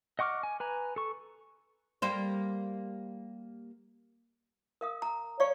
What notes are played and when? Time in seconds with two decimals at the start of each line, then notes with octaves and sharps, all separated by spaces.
0.19 D#5 F#5 C#6 D6 F6
0.43 G#5
0.60 B4 G#5 A#5
0.96 A4 C#6
2.02 G3 A#3 C5
4.81 A#4 F5 D#6
5.02 A#5
5.40 C#5 D5 F5 C#6